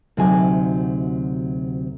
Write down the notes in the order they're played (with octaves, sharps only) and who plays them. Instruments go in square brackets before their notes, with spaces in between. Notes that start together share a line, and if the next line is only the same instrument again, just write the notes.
[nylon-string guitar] D2 C3 F#3 A3 D#4 G#5